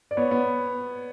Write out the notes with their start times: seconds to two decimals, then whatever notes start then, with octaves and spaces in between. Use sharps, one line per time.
0.11 D5
0.17 B3 C#5
0.31 B3